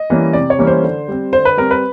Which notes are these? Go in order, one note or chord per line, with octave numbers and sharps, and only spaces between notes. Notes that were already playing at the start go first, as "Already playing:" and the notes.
Already playing: D#5
E3 G3 A#3 C#4
C3 D5
C#5
E3 G3 A#3 C#4
C5
D3
G3 C4
D3 C5
B4
G3 C4 A#4
B4